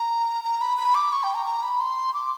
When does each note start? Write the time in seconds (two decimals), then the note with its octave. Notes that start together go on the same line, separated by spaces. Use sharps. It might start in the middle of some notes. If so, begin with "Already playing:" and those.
Already playing: A#5
0.44 A#5
0.61 B5
0.77 B5
0.95 D6
1.12 C#6
1.23 G5
1.35 A#5
1.46 A#5
1.63 B5
1.80 C6
2.14 D6